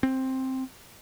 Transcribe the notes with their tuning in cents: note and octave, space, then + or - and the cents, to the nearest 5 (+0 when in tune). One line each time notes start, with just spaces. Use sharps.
C4 +5